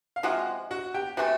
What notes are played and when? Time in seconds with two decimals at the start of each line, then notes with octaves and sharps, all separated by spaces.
0.16 F5
0.23 C3 F3 G#3 F#4 F#5
0.71 F#4 F#5
0.94 G4 G5
1.17 C3 E3 A3 F#4 F#5